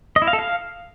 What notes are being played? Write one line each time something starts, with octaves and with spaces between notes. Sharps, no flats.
D#5
E4
F5
A4
F5